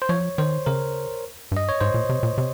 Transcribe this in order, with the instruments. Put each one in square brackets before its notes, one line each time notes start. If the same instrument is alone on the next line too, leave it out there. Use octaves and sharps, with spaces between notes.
[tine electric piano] C5
[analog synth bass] F3 [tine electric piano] C#5
[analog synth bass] D#3 [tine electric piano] C5
[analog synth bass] C#3 [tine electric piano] A#4
[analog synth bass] G2
[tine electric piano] D#5
C#5
[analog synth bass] G#2 [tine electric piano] C5
[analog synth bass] A#2
C3
A#2
C3